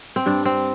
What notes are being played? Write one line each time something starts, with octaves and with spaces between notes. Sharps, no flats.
C4
G2 D4
C4